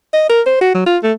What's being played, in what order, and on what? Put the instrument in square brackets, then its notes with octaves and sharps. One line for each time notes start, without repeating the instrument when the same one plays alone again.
[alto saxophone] D#5
A#4
C5
F#4
F#3
F4
A3